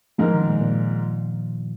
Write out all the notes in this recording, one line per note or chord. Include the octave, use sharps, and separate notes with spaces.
G#2 F3 G#3 D#4 A#4
D#3
A#2
A#2